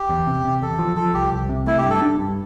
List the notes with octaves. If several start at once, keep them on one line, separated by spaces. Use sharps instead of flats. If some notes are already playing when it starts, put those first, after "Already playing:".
Already playing: G4
E2
C3
C3
E2 A4
F3
F3 A4
C2 G4
C2
C3
A3 E4
G4
G2
A4
D4
G2